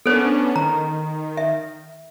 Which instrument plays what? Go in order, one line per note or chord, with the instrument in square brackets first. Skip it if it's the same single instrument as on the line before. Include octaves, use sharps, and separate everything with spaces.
[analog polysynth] B3 C#4 D4 [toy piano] A4 C5
[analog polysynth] D#3 [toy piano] A#5
[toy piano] E5